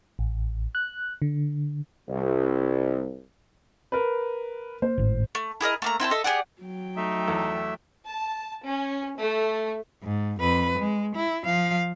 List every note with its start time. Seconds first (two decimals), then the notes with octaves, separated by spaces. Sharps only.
0.19 A1
0.75 F#6
1.22 D3
2.08 C2
3.92 A#4 B4
4.82 A#3 C5
4.98 G#1 A2
5.35 A3
5.61 E4 G#4 A#4 D#5
5.82 A3 A#3 A#5
6.00 C4 E4 G5 A5
6.11 A4 D#5 E5
6.24 G4 G#4 D5 F#5
6.62 F#3 G5
6.97 A3 D#4 E5
7.27 E2 A4
8.06 A5
8.65 C#4
9.18 A3
10.03 G#2
10.40 F2 B4
10.78 G#3
11.16 E4
11.45 F3 F5